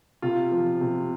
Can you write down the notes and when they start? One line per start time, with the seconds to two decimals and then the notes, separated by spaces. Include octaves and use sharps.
0.22 C3 F4
0.52 F3
0.81 C3